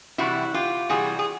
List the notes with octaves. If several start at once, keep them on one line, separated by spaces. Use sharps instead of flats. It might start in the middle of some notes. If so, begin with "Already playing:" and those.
C3 E3 G3 E4 F#4
F4 G4
C3 E3 G3 F#4 G#4
G#4